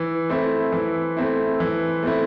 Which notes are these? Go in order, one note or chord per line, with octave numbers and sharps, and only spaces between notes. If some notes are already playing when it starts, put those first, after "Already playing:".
Already playing: E3
A3 C4 E4
E3
A3 C4 E4
E3
A3 C4 E4